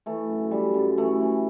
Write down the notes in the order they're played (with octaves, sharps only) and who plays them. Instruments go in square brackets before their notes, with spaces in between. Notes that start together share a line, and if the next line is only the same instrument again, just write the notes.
[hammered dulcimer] E3 A3
F#2
F#2 G3
F#2
E3 A3
E3